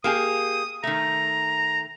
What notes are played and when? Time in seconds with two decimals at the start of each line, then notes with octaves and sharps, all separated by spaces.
0.04 A#3 G4 G#4 D#6
0.84 D#3 A3 A#5